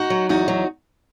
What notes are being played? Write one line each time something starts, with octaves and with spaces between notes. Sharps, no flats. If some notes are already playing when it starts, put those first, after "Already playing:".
Already playing: D#4 F#4
F#3
E2 D#4 F#4
F#3